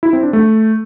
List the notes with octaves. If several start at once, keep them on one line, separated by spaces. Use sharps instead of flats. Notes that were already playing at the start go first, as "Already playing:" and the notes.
E4
C4
D4
A3